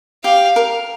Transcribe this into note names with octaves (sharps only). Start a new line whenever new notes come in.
G4 F5
A#4